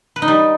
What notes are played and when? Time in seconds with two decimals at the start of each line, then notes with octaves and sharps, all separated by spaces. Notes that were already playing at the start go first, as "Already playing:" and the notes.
0.16 B4
0.22 D#4
0.28 G3